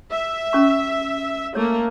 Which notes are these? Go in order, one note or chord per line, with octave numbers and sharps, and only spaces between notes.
E5
C#4 C#6
A3 A#3 C#5